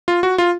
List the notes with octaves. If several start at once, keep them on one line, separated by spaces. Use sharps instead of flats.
F4
F#4
F4